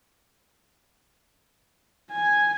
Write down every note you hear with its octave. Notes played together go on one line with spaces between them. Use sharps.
G#5